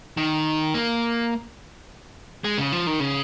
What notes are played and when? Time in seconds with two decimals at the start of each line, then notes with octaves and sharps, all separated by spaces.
0.17 D#3
0.74 A#3
2.44 G#3
2.58 C#3
2.72 F3
2.87 D#3
3.00 C#3